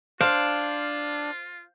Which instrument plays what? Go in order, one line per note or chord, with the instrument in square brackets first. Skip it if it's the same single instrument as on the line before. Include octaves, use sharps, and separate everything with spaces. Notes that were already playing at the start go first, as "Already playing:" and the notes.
[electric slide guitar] D4 [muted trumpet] F4 [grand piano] C5 [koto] F5